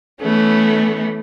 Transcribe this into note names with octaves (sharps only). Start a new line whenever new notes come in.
E3 A3 B3 C#4